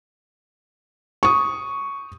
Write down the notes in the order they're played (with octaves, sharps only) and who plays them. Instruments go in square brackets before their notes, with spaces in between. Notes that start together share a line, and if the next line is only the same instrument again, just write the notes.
[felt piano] C#6 D#6